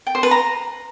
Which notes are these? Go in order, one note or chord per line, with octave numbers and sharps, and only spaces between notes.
G5
C5
B4
A#5